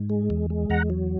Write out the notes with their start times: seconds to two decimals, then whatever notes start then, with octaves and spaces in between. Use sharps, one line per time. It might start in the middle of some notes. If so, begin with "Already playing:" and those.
Already playing: G#2
0.10 G#3
0.30 E2
0.50 G#3
0.70 E2 F#5 A#5
0.90 F#3